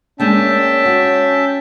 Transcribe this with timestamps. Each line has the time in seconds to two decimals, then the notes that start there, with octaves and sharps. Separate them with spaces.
0.20 G#3 A#3 C#4 D4 E5 G5 A5
0.86 F#4